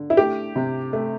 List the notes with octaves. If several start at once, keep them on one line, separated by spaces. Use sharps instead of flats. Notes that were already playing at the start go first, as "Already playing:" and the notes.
Already playing: D3
E4
A3 G4
C3
A3